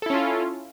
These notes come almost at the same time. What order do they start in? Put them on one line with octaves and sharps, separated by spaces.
A4 E4 C#4 F4